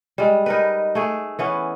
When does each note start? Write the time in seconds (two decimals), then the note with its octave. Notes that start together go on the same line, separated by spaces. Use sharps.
0.18 G3 G#3
0.46 D#4 A#4 B4
0.95 A3 G#4
1.39 E3 B3 C#4